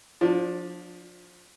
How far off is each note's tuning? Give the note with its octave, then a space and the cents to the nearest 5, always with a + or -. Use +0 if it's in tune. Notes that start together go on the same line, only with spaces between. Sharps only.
F3 +25 D4 +0